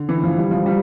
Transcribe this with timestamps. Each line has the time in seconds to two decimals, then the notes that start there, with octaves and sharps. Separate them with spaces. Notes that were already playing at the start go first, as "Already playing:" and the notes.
Already playing: D3
0.09 E3
0.24 F3
0.37 G3
0.51 F3
0.66 G3